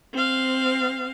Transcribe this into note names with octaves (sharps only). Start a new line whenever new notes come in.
C4 F5